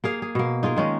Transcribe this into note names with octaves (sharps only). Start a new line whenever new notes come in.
A#3 G#4 F5
G#4
B2 A#3
D#4 F4 G#4 A#4
D#3 G#3 C#4